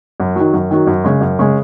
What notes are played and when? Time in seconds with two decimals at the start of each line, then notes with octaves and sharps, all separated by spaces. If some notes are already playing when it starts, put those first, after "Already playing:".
0.20 F#2
0.36 D#3 F#3
0.53 F#2
0.71 D#3 F#3
0.87 F#2
1.04 C#3 G#3
1.21 F#2
1.39 C#3 G#3